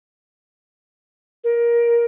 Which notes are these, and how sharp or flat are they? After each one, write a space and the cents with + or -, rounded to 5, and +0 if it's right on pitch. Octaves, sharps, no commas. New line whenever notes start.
A#4 +15